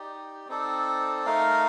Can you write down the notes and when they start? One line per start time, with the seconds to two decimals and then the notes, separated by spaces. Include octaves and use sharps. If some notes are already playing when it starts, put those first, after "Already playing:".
Already playing: D#4 G4 D5
0.48 C4 D#4 A4 D5
1.26 A3 D#4 A#4 F5